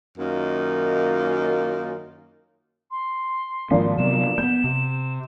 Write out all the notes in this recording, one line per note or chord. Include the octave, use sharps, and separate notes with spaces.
F#2 D#3 A#3 C#4 D#4 F4
C6
G#2 D#3 F3 A#3 D4
C3 F#3 B3 E7
A#3 B3 G6
C3